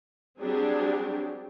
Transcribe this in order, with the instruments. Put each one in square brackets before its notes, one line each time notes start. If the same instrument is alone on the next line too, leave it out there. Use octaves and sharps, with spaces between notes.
[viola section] F#3 G3 C4 D4 G4 G#4